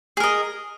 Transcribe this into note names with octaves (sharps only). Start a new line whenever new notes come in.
G#4 A#4 D#5